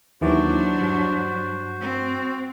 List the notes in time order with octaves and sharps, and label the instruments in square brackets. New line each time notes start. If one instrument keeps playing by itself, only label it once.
[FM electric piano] D#2 E3 D5 [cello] F#3 D4 [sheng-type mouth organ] F#4 C5
[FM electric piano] G2
[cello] C4